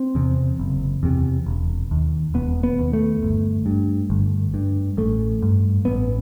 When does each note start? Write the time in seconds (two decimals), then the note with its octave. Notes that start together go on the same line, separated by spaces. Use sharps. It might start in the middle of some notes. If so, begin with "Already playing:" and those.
Already playing: C4
0.15 E2 C3
0.60 F#1
1.03 E2 C3
1.46 E1
1.91 D#2
2.34 E1 B3
2.63 B3
2.79 D#2
2.93 A3
3.23 G1
3.66 G2
4.10 G1
4.54 G2
4.97 A1 A3
5.42 G2
5.85 A1 B3